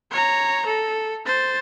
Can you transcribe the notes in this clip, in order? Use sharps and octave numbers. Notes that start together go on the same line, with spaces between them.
C#5 A#5
A4
C5 A6